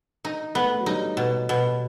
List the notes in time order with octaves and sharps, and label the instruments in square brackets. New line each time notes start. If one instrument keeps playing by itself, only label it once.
[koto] D#4
[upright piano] A3 [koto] B3
[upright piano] F#3
[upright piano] G3 [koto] D#4
[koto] B2
B2